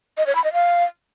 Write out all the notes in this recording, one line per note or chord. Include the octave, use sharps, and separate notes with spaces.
D#5
C#5
B5
D#5
F5